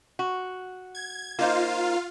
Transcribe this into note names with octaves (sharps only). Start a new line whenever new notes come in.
F#4
G#6
A#3 D#4 F4 C5 F5